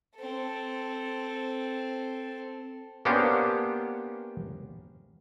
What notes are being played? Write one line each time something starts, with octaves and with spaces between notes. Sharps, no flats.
C4 A4
A#3 B3 C#4 D4 G4 C5